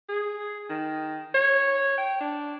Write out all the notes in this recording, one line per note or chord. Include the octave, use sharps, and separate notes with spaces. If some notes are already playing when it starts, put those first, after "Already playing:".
G#4
D#3
C#5
G5
D4